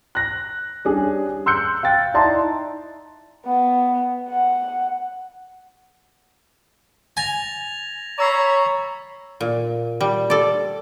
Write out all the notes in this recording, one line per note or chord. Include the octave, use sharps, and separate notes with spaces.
F#6 A#6
G3 C#4 D4 G#4
C6 E6 F#6 G6 C#7
F5 G5 A6
D#4 E4 D5 A5 A#5 C6
B3
F#5
G#5 A6 A#6 F7
C#5 A#5 B5 C#6 E6 C7
A#2
G3
A4 D5